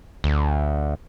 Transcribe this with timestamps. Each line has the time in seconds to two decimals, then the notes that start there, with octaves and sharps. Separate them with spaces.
0.24 D2